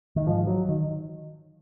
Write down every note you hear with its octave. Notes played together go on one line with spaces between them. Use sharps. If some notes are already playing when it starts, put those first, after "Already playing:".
D#3
G#2 F3
F#3
D#3